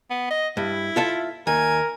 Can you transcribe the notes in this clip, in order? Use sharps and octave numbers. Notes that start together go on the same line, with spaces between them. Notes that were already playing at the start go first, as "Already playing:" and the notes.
B3
D#5
G2 E4
F4 A4 E5
D#2 A#4 G#5